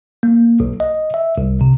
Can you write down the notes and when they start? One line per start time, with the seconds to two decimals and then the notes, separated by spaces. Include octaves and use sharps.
0.23 A#3
0.60 B1
0.80 D#5
1.14 E5
1.38 C2
1.61 C3